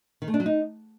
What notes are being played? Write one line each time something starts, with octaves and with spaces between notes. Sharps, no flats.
D#3
A3
D4
F#3
D#4